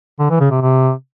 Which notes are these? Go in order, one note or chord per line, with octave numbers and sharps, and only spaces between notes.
D3
E3
C#3
C3
C3